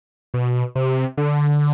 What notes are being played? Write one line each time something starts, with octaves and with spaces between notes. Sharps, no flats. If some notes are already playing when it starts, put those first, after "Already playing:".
B2
C3
D3